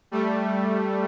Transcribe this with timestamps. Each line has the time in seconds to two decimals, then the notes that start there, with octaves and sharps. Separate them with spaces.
0.11 G3 A3